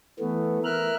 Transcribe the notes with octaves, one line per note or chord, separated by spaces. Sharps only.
E3 A3 B3
A#4 E5 F6 F#6